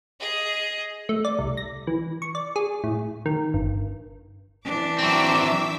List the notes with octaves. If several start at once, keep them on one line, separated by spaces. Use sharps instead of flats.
G#4 D#5
A3
D5
C2
A#6
E3
C#6
D5
G#4
A2
D#3
G1
E3 D4 D6
F#3 C4 E5 D6 E6